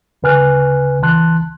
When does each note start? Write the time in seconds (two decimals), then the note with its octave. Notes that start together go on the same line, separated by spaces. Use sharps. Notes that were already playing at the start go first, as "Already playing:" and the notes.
0.23 D2 C#3 B4 G#5 F6 F#6
1.02 C#2 E3 A5 C6 F#6